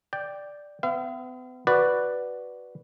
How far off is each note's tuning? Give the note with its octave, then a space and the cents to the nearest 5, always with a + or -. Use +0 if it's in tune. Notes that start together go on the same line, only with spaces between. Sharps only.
D5 +0 G5 +0
B3 +40 F5 -45
F#4 +0 B4 +0 D5 +0